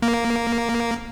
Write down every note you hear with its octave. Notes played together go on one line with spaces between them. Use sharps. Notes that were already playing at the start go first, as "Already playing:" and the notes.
A#3